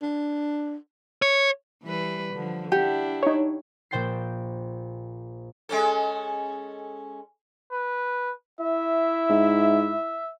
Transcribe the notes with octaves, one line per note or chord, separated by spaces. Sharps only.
D4
C#5
E3 G3 B4
D3 F3
D4 E4 G4 F#5
D#4 C#5
A#1 A#2 C5 G5 A6 C7
G#3 C#4 A4
B4
E4 E5
G#2